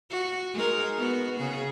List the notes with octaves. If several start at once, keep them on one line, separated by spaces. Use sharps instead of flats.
F#4
G#3 D#4 A#4
B3 F#4
C#3 G#4